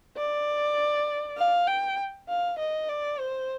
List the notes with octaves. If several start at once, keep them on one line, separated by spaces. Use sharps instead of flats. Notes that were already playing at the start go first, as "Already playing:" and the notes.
D5
F5
G5
F5
D#5
D5
C5